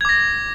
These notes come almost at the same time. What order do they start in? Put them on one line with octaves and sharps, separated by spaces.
G#6 D6 A#6